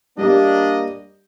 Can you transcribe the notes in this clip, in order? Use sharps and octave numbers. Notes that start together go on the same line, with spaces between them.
G3 A#3 D4 G4 D#5